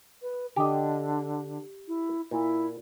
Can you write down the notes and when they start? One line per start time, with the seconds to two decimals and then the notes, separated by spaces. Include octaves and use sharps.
0.22 B4
0.56 D3 G4 D#5
1.88 E4
2.31 A#2 E4